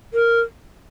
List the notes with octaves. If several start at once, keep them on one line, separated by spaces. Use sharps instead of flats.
A#4